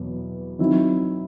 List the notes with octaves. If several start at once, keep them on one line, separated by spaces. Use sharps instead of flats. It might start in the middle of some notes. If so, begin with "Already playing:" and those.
Already playing: E2 B2 F#3 B3
D#3 F#3 C4 E4